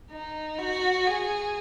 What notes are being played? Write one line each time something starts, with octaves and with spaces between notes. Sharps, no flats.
D#4
F#4
G#4